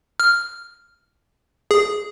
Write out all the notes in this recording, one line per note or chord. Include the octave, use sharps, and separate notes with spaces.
F6
G#4